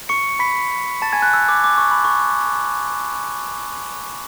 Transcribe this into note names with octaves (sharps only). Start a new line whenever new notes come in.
C#6 C#7
B5 B6
A5 A6
G#5 G#6
F#6
E6
D6
D6
C#6
B5
C#6